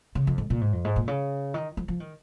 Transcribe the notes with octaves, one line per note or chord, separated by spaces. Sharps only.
C#3
F2
G#2
A#2
G#2
F2
G#2
A#2
C#3
D#3
F3
F3
D#3